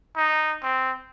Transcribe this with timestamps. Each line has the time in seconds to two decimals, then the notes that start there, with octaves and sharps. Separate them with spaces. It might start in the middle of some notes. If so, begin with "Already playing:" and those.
0.16 D#4
0.63 C4